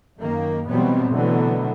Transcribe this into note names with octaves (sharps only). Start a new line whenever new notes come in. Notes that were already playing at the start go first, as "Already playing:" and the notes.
F#2 D#3 A#3
B2 E3 F#3 G3 B3 C4
B2 D3 E3 F#3 A3 B3